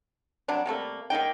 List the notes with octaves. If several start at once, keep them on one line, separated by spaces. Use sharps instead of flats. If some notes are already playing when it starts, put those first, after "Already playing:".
C3 F#3 G3 D4
C3 G3 A3 A#3
D#3 A#3 D#4 G5